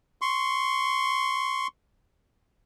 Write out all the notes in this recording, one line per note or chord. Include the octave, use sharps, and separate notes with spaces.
C6 C#6